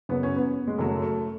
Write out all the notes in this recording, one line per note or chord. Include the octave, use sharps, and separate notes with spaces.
F#2 C#3 F#3 B3
C#4
B3
G#3
F#2 C#3 F#3 A3
A3